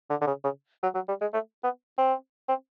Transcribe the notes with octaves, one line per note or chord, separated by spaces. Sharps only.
D3
D3
C#3
C#3
F#3
F#3
G3
G#3
A3
B3
C4
C4